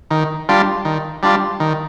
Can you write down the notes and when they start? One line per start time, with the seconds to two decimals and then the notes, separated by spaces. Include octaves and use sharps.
0.11 D#3
0.49 G3 D4 F4
0.85 D#3
1.23 G3 D4 F4
1.60 D#3